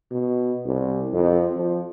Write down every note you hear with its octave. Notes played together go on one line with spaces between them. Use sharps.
B2
C2
F2
F3